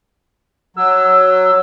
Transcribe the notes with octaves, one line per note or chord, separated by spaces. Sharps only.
F#3 E6